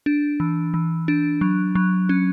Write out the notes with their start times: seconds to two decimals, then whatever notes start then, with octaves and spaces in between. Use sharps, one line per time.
0.06 D4
0.40 E3
0.74 E3
1.08 D4
1.41 F#3
1.75 F#3
2.09 C#4